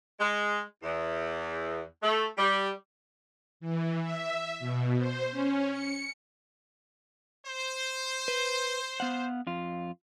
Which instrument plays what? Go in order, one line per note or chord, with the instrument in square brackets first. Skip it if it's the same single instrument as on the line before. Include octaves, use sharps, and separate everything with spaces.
[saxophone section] G#3
E2
A3
G3
[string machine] E3
E5
B2
C5
C#4
C#7
[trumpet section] C5
[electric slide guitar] B4
B3 F5 F#5
F2 F4